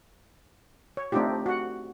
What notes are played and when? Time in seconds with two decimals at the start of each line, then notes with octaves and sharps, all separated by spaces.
0.97 C#5
1.12 A3 C4 D4 D#4 F4 G4
1.46 F#4 F#5